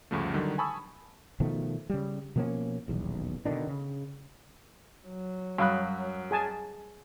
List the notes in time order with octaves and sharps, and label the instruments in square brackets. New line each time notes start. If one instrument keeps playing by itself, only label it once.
[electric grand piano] D2 G2 C#3 F3 A3
D3 D#3 F#3 G3
G#5 A5 B5 C#6 D#6 E6
[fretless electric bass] B2 D#3 F3 A3
C#3 G3
B2 F3 A#3 C#4
D#1 B1 E2
B2 D3 D#3 D4
C#3
[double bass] F#3
[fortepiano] F#2 D#6 F#6 [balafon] G3 F5 B5
[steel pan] G#4 G#5 A5